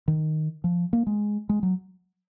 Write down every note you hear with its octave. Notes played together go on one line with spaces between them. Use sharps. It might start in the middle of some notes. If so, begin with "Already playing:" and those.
D#3
F3
A#3
G#3
G#3
F#3